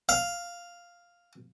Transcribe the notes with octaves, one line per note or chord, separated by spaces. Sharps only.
F5